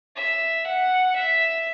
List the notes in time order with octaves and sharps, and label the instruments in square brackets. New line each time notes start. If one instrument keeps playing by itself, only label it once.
[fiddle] E5
F#5
E5